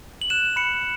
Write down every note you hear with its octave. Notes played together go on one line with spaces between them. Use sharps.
F#7
F#6 E7
B5 C#7